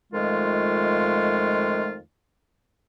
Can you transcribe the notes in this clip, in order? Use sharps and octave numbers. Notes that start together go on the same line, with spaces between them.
F2 D#3 G#3 A3 F4